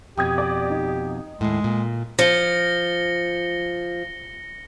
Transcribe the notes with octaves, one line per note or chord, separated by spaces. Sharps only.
F2 B2 G4 G5 D#6 G#6
D5
D#4
D#2 A2 G#3
A#2
F3 A#6 C#7 G7